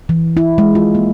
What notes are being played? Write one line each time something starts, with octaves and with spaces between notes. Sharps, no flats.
E3
E4
G#3
F4
A#3